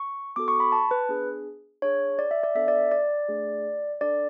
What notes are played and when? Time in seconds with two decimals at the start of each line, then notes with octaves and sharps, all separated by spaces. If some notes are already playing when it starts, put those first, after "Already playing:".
Already playing: C#6
0.36 B3 F#4 A4 D6
0.48 C#6
0.60 B5
0.72 A5
0.91 B4
1.09 B3 D4 G#4
1.82 D4 G#4 C#5
2.19 D5
2.31 E5
2.43 D5
2.55 B3 D4 A4 E5
2.68 D5
2.92 D5
3.29 A3 D4 G#4
4.01 D4 A4 D5